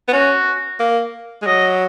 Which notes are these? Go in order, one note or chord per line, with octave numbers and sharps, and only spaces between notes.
B3
C#4 F#4
A#3
G#3
F#3 D#5